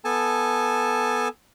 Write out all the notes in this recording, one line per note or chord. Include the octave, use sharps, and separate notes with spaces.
B3 A4 G#5 A5